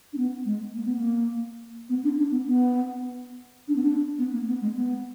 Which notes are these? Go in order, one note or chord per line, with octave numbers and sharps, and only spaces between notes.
D4
B3
G#3
A#3
B3
A#3
B3
D4
D4
B3
B3
D4
B3
D4
B3
A#3
B3
G#3
B3